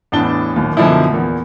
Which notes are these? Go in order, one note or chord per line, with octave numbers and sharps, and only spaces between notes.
A1 E2 A2 D4 A5 G7
D1 D#2 A#2
F#2 B2 D3 F3 D#4 E4
E2 A#2